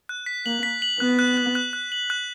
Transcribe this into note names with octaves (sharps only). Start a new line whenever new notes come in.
F#6
B6
A#3 F#7
B6
F#7
B3 F#6
F#6
F#6
F#6
F#6
F#7
F#6